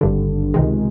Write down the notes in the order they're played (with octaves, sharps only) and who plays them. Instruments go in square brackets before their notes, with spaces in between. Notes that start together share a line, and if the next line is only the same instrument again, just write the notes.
[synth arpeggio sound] G#1 G2 D3
C#2 C3 D#3 G#3